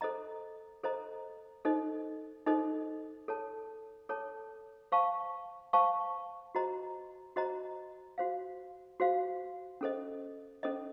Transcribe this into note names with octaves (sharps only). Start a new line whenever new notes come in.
A4 C5 D#5 A#5
A4 C5 D#5 A#5
D#4 A4 C5 D#5
D#4 A4 C5 D#5
A4 C#5 A5
A4 C#5 A5
C5 F5 A5 C#6
C5 F5 A5 C#6
F#4 C5 D#5 A#5
F#4 C5 D#5 A#5
F#4 C5 F5
F#4 C5 F5
C#4 A4 C5 D#5
C#4 A4 C5 D#5